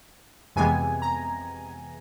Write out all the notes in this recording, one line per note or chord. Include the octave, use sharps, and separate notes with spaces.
F2 C3 E3 G#3 B3 G#5
A#5